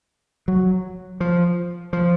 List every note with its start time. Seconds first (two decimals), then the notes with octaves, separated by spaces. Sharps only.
0.48 F#3
1.20 F3
1.93 F3